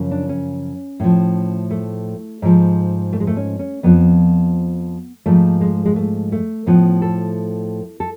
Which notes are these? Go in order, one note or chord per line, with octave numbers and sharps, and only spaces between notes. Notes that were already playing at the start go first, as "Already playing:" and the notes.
Already playing: F#2 C#3 F3
D4
C#4
A2 F3
A3
G#2 F3
A3
G#3
A3
C#4
C#4
F2 F3 B3
G#2 F3 A3
G#3
G#3
A3
A3
A2 F3 B3
A4
A4